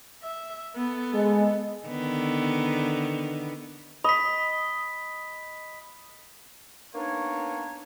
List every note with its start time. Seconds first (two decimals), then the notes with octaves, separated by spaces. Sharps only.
0.22 E5
0.76 B3 A4
1.14 G#3
1.86 D3 D#3 B3
4.04 D#5 B5 B6
6.95 A#3 B3 D4 D#4 C#5